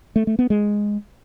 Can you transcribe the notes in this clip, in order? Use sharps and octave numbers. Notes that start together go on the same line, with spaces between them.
A3
A3
B3
G#3